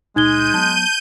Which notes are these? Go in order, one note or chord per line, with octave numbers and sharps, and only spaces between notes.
C#2 A#2 G#3 D#4 G6 G#6 D#7 G7
F#3 A#3 B3 A5